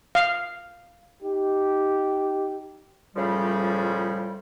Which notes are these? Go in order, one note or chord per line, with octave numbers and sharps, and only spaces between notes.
F5
D#4 G4
C#2 A2 C#3 F3 G3